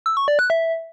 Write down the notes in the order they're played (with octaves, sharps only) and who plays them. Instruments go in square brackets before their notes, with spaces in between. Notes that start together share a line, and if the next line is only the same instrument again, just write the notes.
[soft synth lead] E6
C#6
D5
F#6
E5